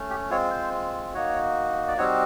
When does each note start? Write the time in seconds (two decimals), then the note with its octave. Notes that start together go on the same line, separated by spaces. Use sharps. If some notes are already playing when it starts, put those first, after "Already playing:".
Already playing: A3 C#4
0.10 G4
0.30 G#3 C4 F4 C#5
0.51 C5
1.14 A#3 D#4 F#4 C#5
1.88 D5
1.97 G3 C4 D#4 F#4 C#5